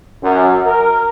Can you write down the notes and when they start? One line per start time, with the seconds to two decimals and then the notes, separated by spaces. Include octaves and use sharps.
0.22 F#2
0.66 A#4